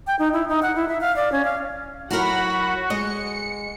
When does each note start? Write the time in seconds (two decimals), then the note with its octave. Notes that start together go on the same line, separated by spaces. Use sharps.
0.07 G5
0.19 D#4
0.33 E4
0.49 D#4
0.63 F#5
0.76 E4
0.89 E5
1.01 F5
1.16 D5
1.32 C#4
1.45 F5
2.11 F#3 E4 F#4 A#4 F#5 B5
2.90 G#3 D#5 C#7